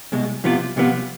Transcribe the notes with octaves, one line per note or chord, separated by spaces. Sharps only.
C2 B2 G#3
C2 C3 F3 B3 F4
C2 C3 F3 B3 F4